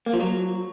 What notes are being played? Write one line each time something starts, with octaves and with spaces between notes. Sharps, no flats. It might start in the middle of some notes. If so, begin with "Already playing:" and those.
A#3
F3
F#3